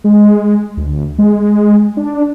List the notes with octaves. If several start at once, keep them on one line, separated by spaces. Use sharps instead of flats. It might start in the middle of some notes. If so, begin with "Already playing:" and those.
G#3
D2
G#3
D4